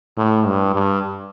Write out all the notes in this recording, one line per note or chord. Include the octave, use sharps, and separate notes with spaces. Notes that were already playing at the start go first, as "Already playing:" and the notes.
A2
G2
G2